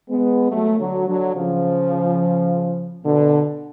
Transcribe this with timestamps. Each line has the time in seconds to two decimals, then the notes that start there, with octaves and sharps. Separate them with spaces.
0.10 G#3 B3
0.51 F#3 A3
0.80 D3 F#3
1.08 D3 F#3
1.36 C#3 F3
3.04 B2 D3